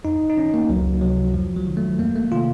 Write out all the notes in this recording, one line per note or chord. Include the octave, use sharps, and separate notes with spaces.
F2 D#4
D#4
D#3 C#4
A#3
C#2 F#3
C3 F3 F#3
F2 F3
F#3
D#3
A3
F2 A#3
A3
C3 D#3 F4